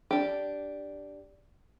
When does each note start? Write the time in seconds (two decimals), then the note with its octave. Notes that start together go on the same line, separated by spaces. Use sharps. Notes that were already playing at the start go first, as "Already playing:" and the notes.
0.11 D4 G4